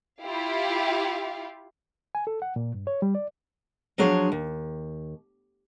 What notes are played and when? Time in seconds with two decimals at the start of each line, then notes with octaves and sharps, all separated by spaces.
0.24 E4 F4 G4 F5
2.15 G#5
2.27 A4
2.42 F#5
2.56 A#2
2.74 G2
2.87 C#5
3.02 G3
3.15 D5
3.98 F3 F#3 D4 G#4 C5 C#5
4.32 D#2